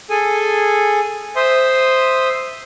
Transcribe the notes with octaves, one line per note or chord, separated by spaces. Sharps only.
G#4 A4 G#5
C5 E5 C6 D#6